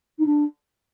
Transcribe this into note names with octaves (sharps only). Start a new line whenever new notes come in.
D#4
D4